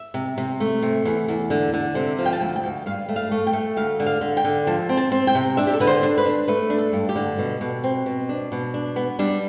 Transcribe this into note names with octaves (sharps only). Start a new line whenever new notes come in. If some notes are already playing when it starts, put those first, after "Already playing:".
Already playing: E5
C3
C3
A3
C3
E2
E2
D3
D3
C3
F3
G5
A5
D2 G5
G5
D2
G2 F5
A3
F5
A3
G5
A3
D2 F5
D3
F5
D3
G5
D3
F3 A5
C4
A5
C4
G5
C3
D4 E5
G4
A4
D3 B4
C5
D4
B4
D4
A3 B4
D4
A4
G2
G4
D3
B2
B2
C4
B2
D4
B2
D4
B3
G3 D4